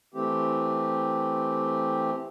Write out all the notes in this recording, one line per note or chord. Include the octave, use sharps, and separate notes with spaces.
E3 A3 C4 G4